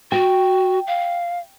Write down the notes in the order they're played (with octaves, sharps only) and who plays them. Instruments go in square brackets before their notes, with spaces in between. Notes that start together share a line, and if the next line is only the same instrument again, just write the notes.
[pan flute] F#4 [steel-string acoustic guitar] G5
[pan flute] F5